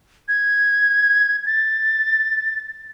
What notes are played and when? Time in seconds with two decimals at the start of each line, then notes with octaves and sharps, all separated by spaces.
0.28 G#6
1.46 A6